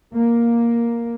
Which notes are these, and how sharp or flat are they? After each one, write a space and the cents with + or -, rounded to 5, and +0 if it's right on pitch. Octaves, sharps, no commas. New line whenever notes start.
A#3 +5